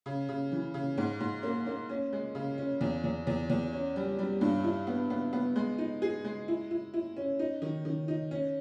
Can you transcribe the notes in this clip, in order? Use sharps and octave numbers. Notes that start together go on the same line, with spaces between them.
C#3
C#3
E3
C#3
G#2
G#2
A#3
A#3
C#4
G#3
C#3
C#4
E2
E2
E2
E2
C#4
G3
G3
G2
E4
B3
B3
B3
G#3
D#4
G#4
G#3
E4
E4
E4
C#4
D#4
D#3
D#3
D#4
C#4